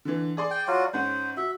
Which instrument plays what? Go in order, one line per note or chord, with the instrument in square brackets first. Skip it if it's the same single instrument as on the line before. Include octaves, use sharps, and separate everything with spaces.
[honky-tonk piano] D3 E3
G#4 D5 C6
[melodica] G5
F#3 F4 F#4
[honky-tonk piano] G#2 C#4 F#5 [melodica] C5
[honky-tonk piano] F#4 [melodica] E5